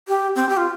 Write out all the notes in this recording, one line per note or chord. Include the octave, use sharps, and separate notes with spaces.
G4
C4
G4
F4